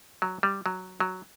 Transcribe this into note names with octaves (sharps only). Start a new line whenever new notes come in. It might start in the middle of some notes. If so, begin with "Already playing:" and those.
F#3
G3
F#3
F#3